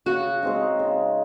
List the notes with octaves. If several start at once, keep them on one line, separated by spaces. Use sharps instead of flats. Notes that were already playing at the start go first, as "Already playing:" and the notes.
C#3 F#4
G#3 C4 D#4
C#3